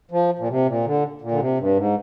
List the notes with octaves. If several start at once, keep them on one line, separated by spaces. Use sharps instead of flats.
F3
A#2
C3
A#2
D3
A#2
D3
C3
G2
G#2